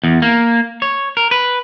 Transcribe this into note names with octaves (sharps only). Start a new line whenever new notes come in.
E2
A#3
C#5
A#4
B4